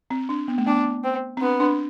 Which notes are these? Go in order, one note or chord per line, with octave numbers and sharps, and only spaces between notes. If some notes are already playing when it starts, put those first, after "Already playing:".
C4
D4
B3
A3
B3 D4
C4
C4
B3 D4
D4